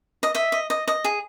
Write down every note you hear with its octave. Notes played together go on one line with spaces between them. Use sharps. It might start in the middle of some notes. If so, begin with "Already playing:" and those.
D#5
D#5 E5
D#5
D#5
D#5
G#4